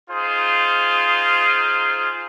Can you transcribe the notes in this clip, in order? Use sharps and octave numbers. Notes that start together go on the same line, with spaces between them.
D#4 F4 G#4 C5